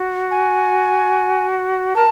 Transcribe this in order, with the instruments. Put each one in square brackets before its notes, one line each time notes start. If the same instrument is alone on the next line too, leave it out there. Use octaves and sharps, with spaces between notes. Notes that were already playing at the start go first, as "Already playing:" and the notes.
Already playing: [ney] F#4
[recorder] G#5
[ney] A#4 [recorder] A5